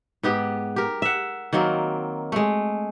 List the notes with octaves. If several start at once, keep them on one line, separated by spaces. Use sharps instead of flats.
G#2 B3 G4 G5
G4 A#4
E5 F#5
D#3 F#3 A#3 C4
G#3 A3